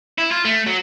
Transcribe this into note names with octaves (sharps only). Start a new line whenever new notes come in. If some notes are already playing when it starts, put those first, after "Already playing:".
E4
F4
A3
F#3